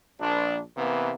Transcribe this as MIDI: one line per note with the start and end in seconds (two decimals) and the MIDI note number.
0.20 0.60 34
0.20 0.60 62
0.77 1.12 48
0.77 1.12 52
0.77 1.12 58
0.77 1.12 59